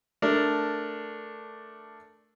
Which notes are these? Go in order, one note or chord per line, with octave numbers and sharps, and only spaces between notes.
A3 D4 A#4